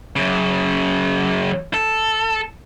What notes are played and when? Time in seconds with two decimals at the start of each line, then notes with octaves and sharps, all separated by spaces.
0.16 F#2 C#3
1.74 A4